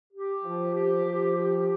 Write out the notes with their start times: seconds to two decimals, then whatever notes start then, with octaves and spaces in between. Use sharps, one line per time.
0.13 G4
0.44 F3
0.74 G4
1.04 F3
1.35 G4